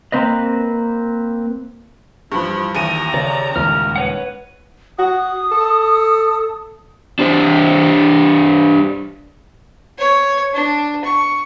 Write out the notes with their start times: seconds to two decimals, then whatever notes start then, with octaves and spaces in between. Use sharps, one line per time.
0.12 A#3 C4 B4 D#5
2.32 G2 E3 F3 B5
2.75 A1 D#2 A#5 D#7
3.14 C#3 D5
3.56 D#1 C#2 D#3 F6
3.96 B4 C#5 F#5
4.99 F#4 D#6
5.52 A4
7.19 D4 G4 C5
9.99 C#5
10.54 D4
11.05 C#6